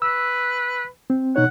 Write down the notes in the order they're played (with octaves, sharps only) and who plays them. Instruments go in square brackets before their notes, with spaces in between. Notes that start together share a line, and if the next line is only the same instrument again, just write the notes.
[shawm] B4 [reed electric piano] E6
[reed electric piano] C4
[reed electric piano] B2 D#4 C#5 [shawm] F#5